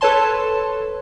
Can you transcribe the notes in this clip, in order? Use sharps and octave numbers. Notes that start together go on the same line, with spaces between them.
A4 B4 C#5 A5 C6